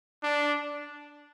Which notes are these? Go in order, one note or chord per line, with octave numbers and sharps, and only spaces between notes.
D4